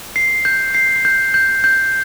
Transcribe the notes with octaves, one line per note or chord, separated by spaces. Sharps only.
C7
G6
C7
G6
G6
G6